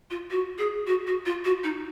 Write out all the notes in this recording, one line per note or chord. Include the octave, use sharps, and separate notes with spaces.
F4
F#4
G#4
F#4
F#4
F4
F#4
D#4